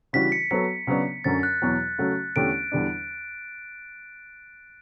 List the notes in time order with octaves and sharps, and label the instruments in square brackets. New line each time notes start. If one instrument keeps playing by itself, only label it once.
[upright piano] C#3 E3 G3 D4 F#4 [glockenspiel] B6
[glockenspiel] C#7
[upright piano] F#3 B3 F#4 A4 [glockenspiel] B6
[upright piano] C#3 F#3 B3 D4
[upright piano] F#2 D3 F#3 C#4 [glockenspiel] A6
[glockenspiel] F#6
[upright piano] E2 B2 F#3
C#3 F#3 A3 C#4 F#4
[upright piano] E2 D3 A3 C#4 G4 [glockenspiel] D7
[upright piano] E2 D3 G3 D4